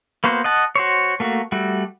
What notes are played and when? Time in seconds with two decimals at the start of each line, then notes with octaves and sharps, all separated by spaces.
0.24 A#3 B3 F#4 C5
0.44 D#5 F#5 A5
0.76 F#4 C5 C#5
1.20 A3 A#3 F#4
1.52 G3 A3 F#4